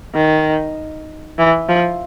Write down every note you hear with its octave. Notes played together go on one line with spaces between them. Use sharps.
D#3
E3
F3